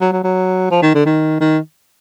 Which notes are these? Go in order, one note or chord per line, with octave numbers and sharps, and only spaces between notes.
F#3
F#3
F#3
F3
D#3
D3
D#3
D#3